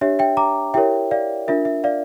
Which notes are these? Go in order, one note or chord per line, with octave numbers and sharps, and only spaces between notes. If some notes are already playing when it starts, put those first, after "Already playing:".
D4 G4 C#5 E5
E5 G5
A#5 D6
E4 G4 A#4 C#5 E5 G5
D5 F5
D4 F4 A#4 E5
E5
D5 F5